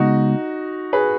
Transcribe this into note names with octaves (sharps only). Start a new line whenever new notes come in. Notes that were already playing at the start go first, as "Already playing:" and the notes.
Already playing: C#3 G#3 B3 D#4 F#4
G#4 B4